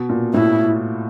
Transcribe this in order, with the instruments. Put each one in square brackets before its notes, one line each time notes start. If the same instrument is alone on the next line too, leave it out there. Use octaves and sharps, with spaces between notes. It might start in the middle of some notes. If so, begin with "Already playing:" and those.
Already playing: [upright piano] B2
A#2
[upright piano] A2 [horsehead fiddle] E4